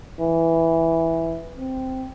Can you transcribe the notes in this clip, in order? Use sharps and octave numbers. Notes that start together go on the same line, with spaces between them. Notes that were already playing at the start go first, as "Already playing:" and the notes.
E3
C4